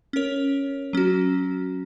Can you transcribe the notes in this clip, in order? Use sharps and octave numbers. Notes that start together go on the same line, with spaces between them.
C#4 A#4 C#5
F#3 C#4 F#4